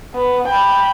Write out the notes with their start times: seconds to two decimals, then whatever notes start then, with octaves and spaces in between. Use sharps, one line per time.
0.15 B3
0.48 G5 B5